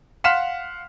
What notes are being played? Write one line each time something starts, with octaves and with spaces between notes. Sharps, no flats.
F5 F#5 C6 F6 B6 E7